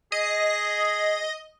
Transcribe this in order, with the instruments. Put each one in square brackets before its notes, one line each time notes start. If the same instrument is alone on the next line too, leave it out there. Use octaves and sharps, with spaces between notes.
[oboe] G#4 [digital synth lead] D#5